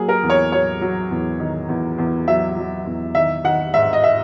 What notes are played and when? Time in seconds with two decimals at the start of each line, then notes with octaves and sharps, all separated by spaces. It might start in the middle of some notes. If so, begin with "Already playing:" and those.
Already playing: F#3 A#3 G#4
0.09 A#4
0.23 E2
0.30 C#5
0.52 F#3 C#5
0.81 F#3
1.11 E2
1.40 D#3
1.68 E2
1.98 E2
2.27 F#3 E5
2.57 F#3
2.86 E2
3.15 D#3 E5
3.44 D#3 F#5
3.74 G#2 E5
3.93 D#5
4.04 E5